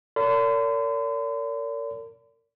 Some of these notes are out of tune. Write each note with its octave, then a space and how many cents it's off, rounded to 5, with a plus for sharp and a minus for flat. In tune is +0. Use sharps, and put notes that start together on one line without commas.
A#4 -35 D5 -45 C6 -45